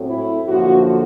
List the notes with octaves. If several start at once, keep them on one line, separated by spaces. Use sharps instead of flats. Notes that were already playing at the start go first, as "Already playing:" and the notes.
Already playing: A2 F#3 A3 C4
E4
F#2 D3 F3 A#3 F#4